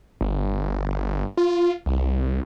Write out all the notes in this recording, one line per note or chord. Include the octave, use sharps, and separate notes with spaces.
G1
G1
F4
C2